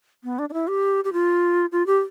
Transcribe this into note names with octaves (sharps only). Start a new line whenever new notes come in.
B3
D4
D4
E4
G4
G4
F4
F4
G4